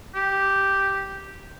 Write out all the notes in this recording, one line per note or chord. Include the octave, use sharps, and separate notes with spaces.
G4